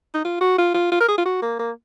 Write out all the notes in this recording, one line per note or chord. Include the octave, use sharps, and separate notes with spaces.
D#4
F4
F#4
F4
F4
F4
A#4
G#4
F4
F#4
A#3
A#3